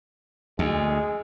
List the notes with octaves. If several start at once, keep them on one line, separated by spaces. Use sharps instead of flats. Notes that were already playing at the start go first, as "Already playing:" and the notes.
D2 G#3